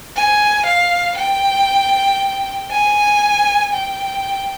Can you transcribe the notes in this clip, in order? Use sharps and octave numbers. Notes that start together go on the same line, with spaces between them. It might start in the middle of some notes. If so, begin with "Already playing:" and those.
G#5
F5
G5
G#5
G5